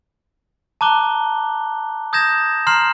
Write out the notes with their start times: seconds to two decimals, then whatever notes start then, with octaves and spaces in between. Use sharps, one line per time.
0.81 A5 A#5 D6 F#6 G7
2.13 D#6 G6 G#6 A#6 E7
2.67 A#5 C6 F6 C7 E7 F#7